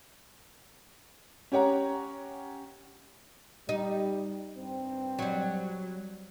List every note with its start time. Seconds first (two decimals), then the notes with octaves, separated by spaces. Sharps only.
1.52 C#4 G4 C#5 F#5 A#5
3.69 G3 D#4
4.56 G2 C4
5.19 F#3 G3